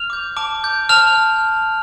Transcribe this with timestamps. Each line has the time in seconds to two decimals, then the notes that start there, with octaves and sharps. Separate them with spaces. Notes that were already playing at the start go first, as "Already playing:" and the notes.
Already playing: F6 F7
0.10 D6 G6
0.37 A5 D6 D7
0.63 D6 G6
0.89 A5 F6 F7